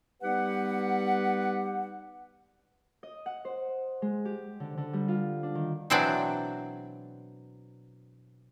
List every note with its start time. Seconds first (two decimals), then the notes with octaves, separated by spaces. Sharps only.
0.23 G3 B3 D#4 G4 B4 F#5
3.03 D#5
3.26 F#5
3.45 C5
4.02 G#3
4.25 G4
4.60 D3
4.78 D3
4.93 G3
5.08 F4
5.43 D4
5.55 D#3
5.90 B2 E3 F#3 C4 D4 D5